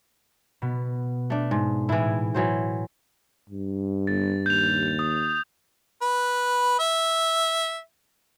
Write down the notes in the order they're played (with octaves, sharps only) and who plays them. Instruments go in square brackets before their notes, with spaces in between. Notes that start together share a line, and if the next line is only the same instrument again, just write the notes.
[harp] B2 B3
[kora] A3 D4
G#2
[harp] A2 [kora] E3 E4
[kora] E3 F#3 C5
[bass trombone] G2
[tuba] G1 [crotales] A6
[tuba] D#2 [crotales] G6 F7
[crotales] D#6
[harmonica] B4
E5